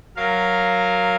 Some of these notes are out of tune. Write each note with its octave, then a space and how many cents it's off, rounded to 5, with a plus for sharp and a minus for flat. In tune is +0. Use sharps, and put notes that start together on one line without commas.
F#3 +0 A#4 +0 F5 +0